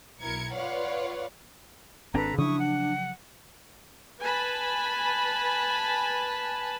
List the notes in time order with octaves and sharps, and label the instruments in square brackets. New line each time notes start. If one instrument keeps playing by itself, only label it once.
[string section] B1 E4 A#4 G#6 C#7
F4 B4 C#5 D5 F5 F#5
[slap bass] G#1 C4 D4 [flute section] A4 B4 A#5
[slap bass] C#3 F3 F#3 [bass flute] D4 [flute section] E4 C#6 D#6
[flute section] F#5
[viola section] B4 G#5 A5 B5